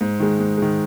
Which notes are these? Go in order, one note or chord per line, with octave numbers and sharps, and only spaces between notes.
G#2
D#3 G#3
G#2
D#3 G#3